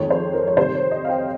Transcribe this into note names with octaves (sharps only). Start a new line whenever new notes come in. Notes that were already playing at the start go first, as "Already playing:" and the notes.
Already playing: F2 D#3 G#3 C#5
C5
A#4
C#5
C3 D#3 G3 C5
C#5
D#5
F5
G5